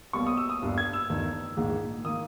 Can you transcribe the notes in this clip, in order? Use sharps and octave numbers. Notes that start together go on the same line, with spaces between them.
B1 B2 G3 A#3 C#6
D#6
E6
D#6
G1 G2 G3 A#3
G#6
E6
G1 G2 D#3
A#1 G#2 D#3 A#3
D#3 A#3 D#6